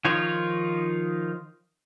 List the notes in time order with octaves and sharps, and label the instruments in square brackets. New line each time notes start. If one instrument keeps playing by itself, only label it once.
[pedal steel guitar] D#3 F3 D#4 F4 C#5